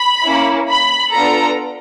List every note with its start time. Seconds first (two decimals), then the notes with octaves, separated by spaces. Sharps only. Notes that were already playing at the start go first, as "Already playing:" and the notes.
Already playing: B5
0.25 A#3 C#4 E4
0.70 B5
1.13 B3 D4 F4 A4 A#5